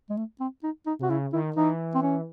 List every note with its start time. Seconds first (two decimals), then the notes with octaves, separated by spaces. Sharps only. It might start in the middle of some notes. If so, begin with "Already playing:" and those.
0.10 G#3
0.17 A3
0.40 C4
0.63 D#4
0.87 D#4
0.99 C3 F#4
1.10 C#3 E4
1.33 D#3 E4
1.56 E3 D#4
1.95 C4
2.03 C#4